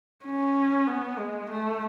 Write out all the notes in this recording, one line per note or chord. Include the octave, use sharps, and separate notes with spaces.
C#4
B3
G#3
A3